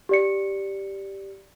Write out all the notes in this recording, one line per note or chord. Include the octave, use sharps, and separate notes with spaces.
G4 D5 C#7